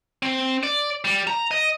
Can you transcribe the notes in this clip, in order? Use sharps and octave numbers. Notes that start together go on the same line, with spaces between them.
C4
D5
G3
A#5
D#5